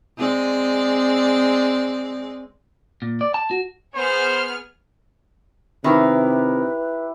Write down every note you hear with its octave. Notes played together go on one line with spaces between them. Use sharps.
G#3 C4 D5
A#2
D5
A5
F#4
B3 G#4 C5 F6
C3 D#3 E4 G4 B4 A#5